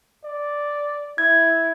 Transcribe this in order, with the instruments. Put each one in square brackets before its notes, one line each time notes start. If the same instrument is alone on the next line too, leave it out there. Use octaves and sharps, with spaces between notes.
[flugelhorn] D5
[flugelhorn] E4 [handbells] G#6